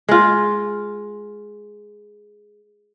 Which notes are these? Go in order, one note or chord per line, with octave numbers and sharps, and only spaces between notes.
G#3 F4